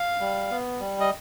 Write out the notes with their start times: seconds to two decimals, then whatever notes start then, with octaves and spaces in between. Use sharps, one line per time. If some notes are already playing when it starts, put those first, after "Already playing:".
Already playing: F5
0.20 G3
0.51 B3
0.80 G3
1.00 D#5